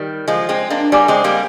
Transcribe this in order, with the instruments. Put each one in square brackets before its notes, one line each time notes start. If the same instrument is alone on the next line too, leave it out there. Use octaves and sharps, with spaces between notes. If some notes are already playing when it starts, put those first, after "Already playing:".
Already playing: [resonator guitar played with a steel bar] D#3 G3
F3 G#3
G#3 C4
A#3 D4
[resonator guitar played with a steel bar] G3 A#3 [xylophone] D5 G#5 D6
[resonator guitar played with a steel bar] G#3 C4
G3 A#3